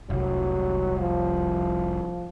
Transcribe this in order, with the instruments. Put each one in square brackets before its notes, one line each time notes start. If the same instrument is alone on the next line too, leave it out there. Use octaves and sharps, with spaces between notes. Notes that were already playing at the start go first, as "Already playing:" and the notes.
[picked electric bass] F1 C2 [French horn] F#3
[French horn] F3